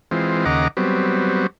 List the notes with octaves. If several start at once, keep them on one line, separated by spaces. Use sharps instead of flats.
E3 G#3 C4 F4
D#2 C#3 D#5 F#5 A#5 D6
F#3 G3 B3 C4